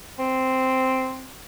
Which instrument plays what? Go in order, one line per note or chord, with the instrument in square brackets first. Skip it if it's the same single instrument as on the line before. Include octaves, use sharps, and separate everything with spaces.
[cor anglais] C4